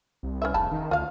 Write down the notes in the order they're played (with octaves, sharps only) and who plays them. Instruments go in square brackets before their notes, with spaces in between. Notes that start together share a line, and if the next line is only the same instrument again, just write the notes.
[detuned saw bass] C2
[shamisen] C#4 B4 E5
[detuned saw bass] F1 [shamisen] C#3 A5 B5
[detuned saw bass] D#3
[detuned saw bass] D2 [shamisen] F4 F5